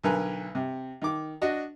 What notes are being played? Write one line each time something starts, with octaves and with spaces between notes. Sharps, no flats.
B1 D3 A#4 B4 G#5
C3
D#3 D6
D4 F#4 D#5